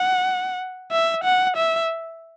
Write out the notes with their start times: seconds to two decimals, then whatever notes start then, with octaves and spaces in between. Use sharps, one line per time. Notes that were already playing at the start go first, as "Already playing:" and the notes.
Already playing: F#5
0.91 E5
1.24 F#5
1.57 E5